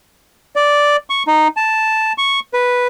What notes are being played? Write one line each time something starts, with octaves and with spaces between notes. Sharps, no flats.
D5
C#6
D#4
A5
C#6
B4